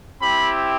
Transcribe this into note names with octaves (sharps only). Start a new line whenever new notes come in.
C4 E4 G4 B5